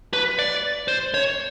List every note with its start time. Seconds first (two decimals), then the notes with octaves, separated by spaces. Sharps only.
0.13 B4
0.39 D5
0.88 C5
1.14 C#5